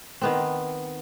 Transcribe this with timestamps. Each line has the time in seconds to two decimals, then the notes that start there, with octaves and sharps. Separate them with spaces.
0.21 D#3 B3 C4